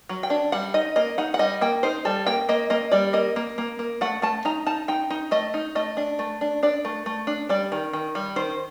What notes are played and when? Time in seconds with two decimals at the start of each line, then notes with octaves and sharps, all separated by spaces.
0.09 F#3
0.23 G5
0.30 D4
0.52 G3 F#5
0.74 D#4 D#5
0.96 A#3 D#5
1.18 D#4 F#5
1.34 F#5
1.39 G3 D#5
1.61 A#3 G5
1.83 D#4 C5
2.05 G3 A4
2.26 A#3 G5
2.49 A#3 D#5
2.70 A#3 D#5
2.92 G3 D5
3.13 A#3 D#5
3.36 A#3
3.58 A#3
3.79 A#3
4.01 A3 F#5
4.22 A3 A5
4.45 D#4 A#5
4.66 D#4 A5
4.88 D#4 G5
5.10 D#4
5.31 A3 D#5
5.54 D#4
5.75 A3 D#5
5.97 D4
6.19 A3
6.41 D4
6.63 D4 D5
6.85 A3
7.06 A3
7.27 D4
7.49 G3 D5
7.72 D#3
7.93 D#3
8.15 G3
8.36 D#3 C5